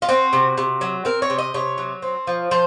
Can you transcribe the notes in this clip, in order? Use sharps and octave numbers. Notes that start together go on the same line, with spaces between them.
F4
C4 F#4
C3
C3
F#3
C4 A#4
C#5
C3
D#5
C3 C#5
F#3
C4
F3
F3 C5